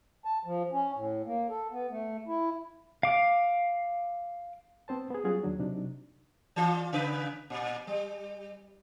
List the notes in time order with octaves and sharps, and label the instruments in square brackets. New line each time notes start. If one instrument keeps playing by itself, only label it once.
[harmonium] A5
F3
C#4
A2
A#3
A4
B3
A3
E4
[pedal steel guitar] F5 D6
[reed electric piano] B3 C4 C5 A5
B3 G#4
F#3 G3 C#4 F4 F#4 G#4
D#2 F#3 D4
C3 F#3 D4 D#4
[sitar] E3 F4
C#3 B4
A#2
G3